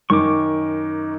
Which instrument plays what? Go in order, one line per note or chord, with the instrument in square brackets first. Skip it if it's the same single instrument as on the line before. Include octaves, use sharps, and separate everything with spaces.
[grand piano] F#2 D#3 D#4 [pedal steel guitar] C#6 D6